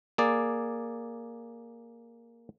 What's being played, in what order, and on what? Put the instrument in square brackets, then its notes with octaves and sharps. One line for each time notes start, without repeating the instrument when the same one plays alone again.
[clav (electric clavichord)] A#3 G#4 D5